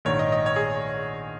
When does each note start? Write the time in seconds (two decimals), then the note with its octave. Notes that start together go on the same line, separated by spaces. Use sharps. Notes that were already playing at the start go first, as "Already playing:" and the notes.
0.05 A#1 G#2 D#3 C#5
0.19 D#5
0.32 D#5
0.46 C#5
0.56 G#4